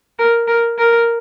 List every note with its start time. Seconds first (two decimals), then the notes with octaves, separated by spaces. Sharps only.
0.19 A#4
0.48 A#4
0.78 A#4